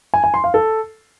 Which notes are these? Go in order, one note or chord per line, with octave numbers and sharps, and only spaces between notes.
G#5
G#5
C6
F5
A4